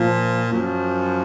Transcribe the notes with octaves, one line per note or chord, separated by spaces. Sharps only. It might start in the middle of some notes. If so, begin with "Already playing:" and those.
Already playing: A#2 F3
F#2 F3